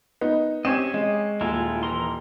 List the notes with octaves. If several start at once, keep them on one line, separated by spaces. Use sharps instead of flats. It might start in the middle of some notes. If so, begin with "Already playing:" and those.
B3 D#4
C4 C#4 G4 C#5 D#5 E7
G#3
D#1 G#3 E4 F4
E3 A#4 C6